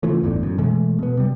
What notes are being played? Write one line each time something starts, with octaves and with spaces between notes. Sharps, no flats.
C#3 E3 F3 A3
G1 E2 A2 D3
F#2
B2 E3 G#3 A3
B2 B3
C3 G3